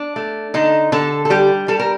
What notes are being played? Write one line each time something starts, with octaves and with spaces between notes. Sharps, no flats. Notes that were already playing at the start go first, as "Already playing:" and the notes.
Already playing: D4
A3
D3 D#4
D3 A4
A4
G3 G4
G3 A4
A#4